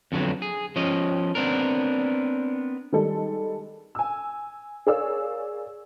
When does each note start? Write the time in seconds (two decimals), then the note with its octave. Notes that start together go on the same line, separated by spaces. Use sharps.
0.12 F2 D3 F#3 B3
0.42 G#4
0.76 F3 C#4 D#5
1.35 B3 C4 D4 A#4
2.92 D#3 G3 G#3 A4
3.95 G#5 E6
4.87 G#4 A#4 C#5 D5 F5 E6